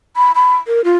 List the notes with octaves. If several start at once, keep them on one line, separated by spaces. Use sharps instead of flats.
B5
B5
A#4
F4